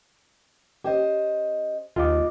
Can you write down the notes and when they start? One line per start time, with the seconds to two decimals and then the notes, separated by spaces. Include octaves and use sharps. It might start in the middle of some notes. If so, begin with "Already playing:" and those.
0.84 C#4 G4 C5 D#5
1.96 D#2 F4 D#5 D6